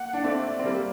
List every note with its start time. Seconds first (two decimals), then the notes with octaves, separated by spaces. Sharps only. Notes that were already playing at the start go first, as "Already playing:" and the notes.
Already playing: A#3 F#5
0.13 D4
0.24 A3 C4 D5
0.59 C4
0.65 G3 A#3